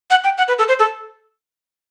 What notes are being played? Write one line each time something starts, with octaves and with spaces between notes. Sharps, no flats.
F#5
G5
F#5
B4
A4
C5
A4